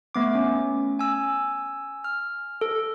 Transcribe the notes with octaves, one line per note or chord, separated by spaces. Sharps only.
A3 B3 D6
C#4
G#5 E6
F6
A4